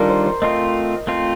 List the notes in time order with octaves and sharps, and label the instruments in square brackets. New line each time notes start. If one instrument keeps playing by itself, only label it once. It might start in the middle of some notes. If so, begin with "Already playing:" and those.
Already playing: [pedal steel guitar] D#3 G3 D4 F4 A4 [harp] A#4 D5
[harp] C5
C5
[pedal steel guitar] A3 C4 F4 [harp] D#5
[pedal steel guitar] A3 C4 F4